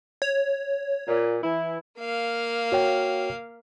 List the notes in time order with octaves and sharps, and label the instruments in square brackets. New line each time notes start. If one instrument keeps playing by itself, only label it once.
[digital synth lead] C#5
[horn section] A#2
E3 E4
[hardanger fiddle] A#3 F5
[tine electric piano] F#4 C#5 G5